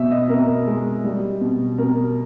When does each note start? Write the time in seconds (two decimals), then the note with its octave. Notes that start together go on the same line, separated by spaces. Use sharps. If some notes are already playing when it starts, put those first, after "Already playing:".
Already playing: B2 B3 E5
0.11 D#5
0.29 B2 A#4
0.67 G#3
1.04 G3
1.41 B2
1.78 B2 A#4